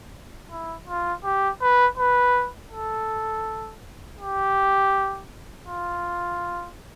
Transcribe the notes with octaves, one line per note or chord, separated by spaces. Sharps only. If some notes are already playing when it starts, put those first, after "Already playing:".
E4
F4
G4
B4
B4
A4
G4
F4